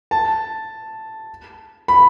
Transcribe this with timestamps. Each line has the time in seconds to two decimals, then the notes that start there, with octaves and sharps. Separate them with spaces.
0.11 A5
1.88 B5